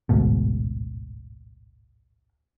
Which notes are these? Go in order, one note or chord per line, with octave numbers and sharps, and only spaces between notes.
A1 D2 G#2 B2